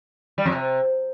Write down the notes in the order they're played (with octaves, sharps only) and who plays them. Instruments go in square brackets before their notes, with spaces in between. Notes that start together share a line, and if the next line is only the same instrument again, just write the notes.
[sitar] G3
F2
C3